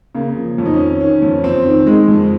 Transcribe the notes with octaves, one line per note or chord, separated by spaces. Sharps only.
C#3 A#3
F3
F2 C#4
D#4
C#4
D#3
D#3 C#4
F2
F2 C4
D#3
D#3 G#3
F2